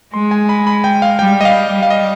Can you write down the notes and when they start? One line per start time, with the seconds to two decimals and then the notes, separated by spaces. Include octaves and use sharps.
0.13 G#3 C6
0.31 G#5
0.49 B5
0.67 B5
0.84 G5
1.02 F5
1.19 G3 G5
1.41 D#5
1.45 F5
1.72 G3
1.83 F5
1.90 D#5